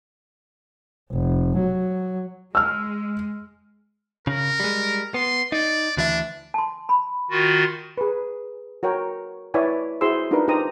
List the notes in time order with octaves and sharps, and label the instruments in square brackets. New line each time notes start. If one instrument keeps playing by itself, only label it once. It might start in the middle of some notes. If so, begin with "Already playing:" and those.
[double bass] F1
F#3
[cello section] G#3 [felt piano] E6 F6
[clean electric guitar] C#3 [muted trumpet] A#4
[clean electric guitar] G3 G#3
[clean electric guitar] B3 [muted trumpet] C6
[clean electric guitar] D#4 [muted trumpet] D5
[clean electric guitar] D2 E3 E5 [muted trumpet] D4
[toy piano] A5 C6
B5
[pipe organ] D#3 F4 F#4
[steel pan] G#4 B4
F#4 A#4 C#5 G5
E4 B4 C#5 D5 G#5
E4 F#4 G#4 C5 C6 E6
D4 D#4 F4 F#4 A#4 B4
D#4 G4 C5 D#5 A#5 D#6